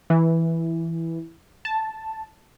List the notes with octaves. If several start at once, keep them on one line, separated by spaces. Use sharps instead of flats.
E3
A5